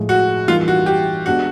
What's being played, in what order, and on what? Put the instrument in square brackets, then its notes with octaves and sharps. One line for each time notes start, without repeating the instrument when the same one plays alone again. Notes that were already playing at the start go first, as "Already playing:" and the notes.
Already playing: [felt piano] A2 F3 G#3
[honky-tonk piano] F#4
[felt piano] E3 G3 A#3 D#4 [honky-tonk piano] F4
[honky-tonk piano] F#4
G4
[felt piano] G#3 B3 D4 G4 [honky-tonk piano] F#4